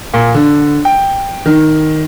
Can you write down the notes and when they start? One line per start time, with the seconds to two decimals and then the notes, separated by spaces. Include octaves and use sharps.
0.14 A#2
0.34 D3
0.85 G5
1.46 D#3